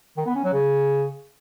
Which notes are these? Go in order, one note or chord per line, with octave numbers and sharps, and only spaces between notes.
D#3
B3
C#4
F#3
C#3